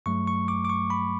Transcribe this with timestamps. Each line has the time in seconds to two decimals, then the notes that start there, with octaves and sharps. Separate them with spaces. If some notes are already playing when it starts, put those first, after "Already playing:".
0.06 G2 F#3 A3 C#6
0.27 C#6
0.48 D6
0.65 D6
0.69 C#6
0.90 B5